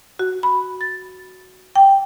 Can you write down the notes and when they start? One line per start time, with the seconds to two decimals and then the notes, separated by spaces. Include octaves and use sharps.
0.19 F#4
0.43 B5
0.81 A6
1.75 G5